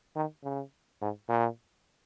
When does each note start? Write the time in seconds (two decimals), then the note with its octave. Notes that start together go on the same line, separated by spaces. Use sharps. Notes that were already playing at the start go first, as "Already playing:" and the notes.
0.16 D#3
0.43 C#3
1.01 G#2
1.29 A#2